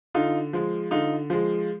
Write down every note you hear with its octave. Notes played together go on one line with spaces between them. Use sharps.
D3 D#4 F4
F3 G#3
D3 D#4 F4
F3 G#3